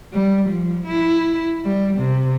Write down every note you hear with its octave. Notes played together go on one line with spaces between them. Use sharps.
G3
F3
E4
G3
C3